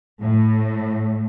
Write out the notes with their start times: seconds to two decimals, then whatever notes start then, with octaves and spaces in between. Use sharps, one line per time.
0.22 A2